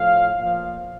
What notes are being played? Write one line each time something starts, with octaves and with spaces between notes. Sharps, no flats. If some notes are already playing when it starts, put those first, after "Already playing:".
Already playing: A2 F3 F5
A#2 F3 F5